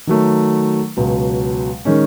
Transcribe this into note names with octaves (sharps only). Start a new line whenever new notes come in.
D#3 F#3 A3
C#2 B2 F#3
D#3 G#3 C#4